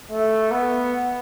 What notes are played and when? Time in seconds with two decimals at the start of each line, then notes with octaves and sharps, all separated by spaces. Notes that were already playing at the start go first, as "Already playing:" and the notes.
0.10 A3
0.51 B3